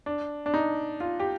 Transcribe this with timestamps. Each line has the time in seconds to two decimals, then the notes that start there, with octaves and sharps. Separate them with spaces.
0.06 D4
0.46 D4
0.54 D#4
1.00 F4
1.20 G4